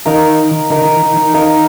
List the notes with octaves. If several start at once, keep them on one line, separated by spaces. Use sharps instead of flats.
D#3 D#4 A#4 F5
D3 D#4 A#4 F5
D#3
D#3
D#3
D#4 A#4 F5